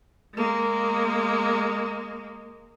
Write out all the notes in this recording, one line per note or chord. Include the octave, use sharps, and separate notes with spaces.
G#3 A#3